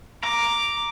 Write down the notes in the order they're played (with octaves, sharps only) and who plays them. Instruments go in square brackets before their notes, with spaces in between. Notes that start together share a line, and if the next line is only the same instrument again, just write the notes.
[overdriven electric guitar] A#5 [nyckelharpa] D6